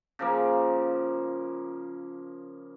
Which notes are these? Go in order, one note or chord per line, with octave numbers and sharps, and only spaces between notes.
C#3 F3 A#3